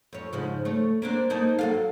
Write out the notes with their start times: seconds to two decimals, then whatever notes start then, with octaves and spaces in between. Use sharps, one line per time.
0.13 F2 C#5
0.33 G#2 C#3 F3
0.65 A3 C#5
1.02 A#3 C4 D4
1.30 A#3 D#4 A4
1.59 F#3 A4 F5